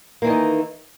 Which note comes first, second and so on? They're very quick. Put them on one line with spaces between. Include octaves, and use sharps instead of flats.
A#3 E3 D#3 D#4